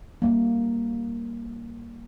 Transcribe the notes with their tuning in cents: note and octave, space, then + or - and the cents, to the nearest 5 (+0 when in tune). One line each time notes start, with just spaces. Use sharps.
G3 +0 A#3 +0